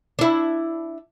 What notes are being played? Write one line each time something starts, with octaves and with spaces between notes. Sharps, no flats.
D4 E4